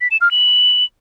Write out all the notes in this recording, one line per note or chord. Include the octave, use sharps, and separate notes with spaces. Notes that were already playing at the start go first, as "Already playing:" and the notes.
B6
E7
F6
F#7